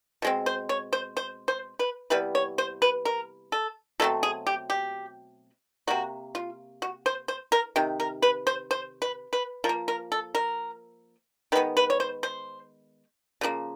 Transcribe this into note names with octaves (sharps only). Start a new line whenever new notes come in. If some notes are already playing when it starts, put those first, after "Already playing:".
B2 G#3 C4
C5
C#5
C5
C5
C5
B4
C3 E3 G3 B3 B4
C#5
C5
B4
A#4
A4
B2 F#3 A3 C4 A4
G#4
G4
G4
C3 F3 A#3 F#4
F4
F#4
C5
C5
A#4
C3 D#3
A#4
B4
C5
C5
B4
B4
F3 A#4
A#3
A#4
A4
A#4
D#3 G#3 B3 B4
B4
C#5
C5
C5
C#3 F3 A#3